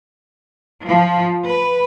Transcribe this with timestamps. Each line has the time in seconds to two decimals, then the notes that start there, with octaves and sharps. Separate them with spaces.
0.86 F3
1.46 B4